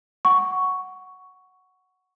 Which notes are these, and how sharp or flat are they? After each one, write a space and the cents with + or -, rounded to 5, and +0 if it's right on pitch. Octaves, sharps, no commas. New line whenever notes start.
F#5 +0 C#6 +5